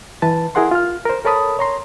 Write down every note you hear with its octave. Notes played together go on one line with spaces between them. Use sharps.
E3 B4 A5
E4 G#4 A#4 F#5 C6
F4 F6
A#4 C5
A4 A#4 C#5 A5 B5 D#6
C#5 A#5 C6